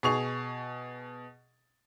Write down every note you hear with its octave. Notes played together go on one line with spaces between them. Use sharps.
B2 G#4 C#6 F7